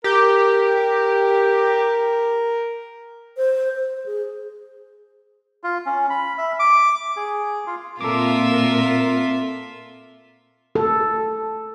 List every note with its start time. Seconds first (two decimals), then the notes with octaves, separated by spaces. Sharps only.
0.04 G4 A#4
3.37 C5
3.76 C5
4.06 G#4
5.63 F4
5.86 C#4
6.10 B5
6.38 E5
6.59 D6
7.17 G#4
7.67 F4
8.01 A#2 C4 F4 A4 A#4 E5 D6
10.75 A4